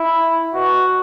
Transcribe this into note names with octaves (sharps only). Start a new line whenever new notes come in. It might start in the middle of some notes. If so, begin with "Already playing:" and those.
Already playing: E4
B2 F#4